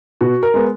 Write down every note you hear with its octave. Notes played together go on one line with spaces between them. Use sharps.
B2 F#4
A#4
G#3 B3